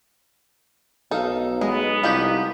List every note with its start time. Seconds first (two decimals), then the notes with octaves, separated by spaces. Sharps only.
1.11 B1 D#4 A4 F5
1.61 G#3 B3 D#5
2.03 C2 F3 D#4 G4